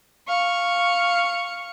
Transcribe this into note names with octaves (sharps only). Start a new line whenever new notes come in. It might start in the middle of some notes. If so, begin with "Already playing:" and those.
F5 C#6